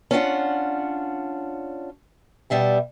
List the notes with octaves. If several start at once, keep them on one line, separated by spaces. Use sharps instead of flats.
C#4 D4 F4 F#5
B2 G3 E5 F#5